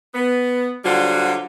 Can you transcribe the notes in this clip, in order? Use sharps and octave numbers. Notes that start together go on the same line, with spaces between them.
B3
D3 F#3 G3 F4 F#4 C5